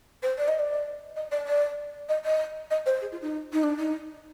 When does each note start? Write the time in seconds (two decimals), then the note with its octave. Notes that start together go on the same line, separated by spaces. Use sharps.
0.23 C5
0.38 D5
0.48 D#5
0.59 D5
1.16 D#5
1.31 D5
1.46 D5
2.09 D#5
2.24 D#5
2.71 D#5
2.86 C5
3.01 G#4
3.12 F4
3.22 D#4
3.53 D#4
3.63 D4
3.79 D#4